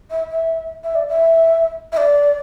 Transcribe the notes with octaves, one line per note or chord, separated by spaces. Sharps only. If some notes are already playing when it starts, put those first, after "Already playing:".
E5
E5
E5
D5
E5
E5
D5